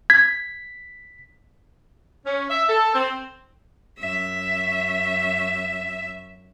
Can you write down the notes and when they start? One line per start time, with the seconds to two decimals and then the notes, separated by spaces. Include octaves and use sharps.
0.10 G#6 B6
2.26 C#4
2.50 E5
2.69 A4
2.95 C4
3.99 F#2 E5